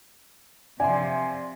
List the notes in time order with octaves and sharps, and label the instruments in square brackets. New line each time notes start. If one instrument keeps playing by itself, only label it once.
[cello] C3 F3 [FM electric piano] D5 E5 C6 [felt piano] G#5